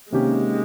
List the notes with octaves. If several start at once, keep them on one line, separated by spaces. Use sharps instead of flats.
C3 D#3 G#3 A#3 C#4 G4